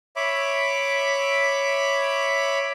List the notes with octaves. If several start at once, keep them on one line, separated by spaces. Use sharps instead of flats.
C#5 E5 B5 D6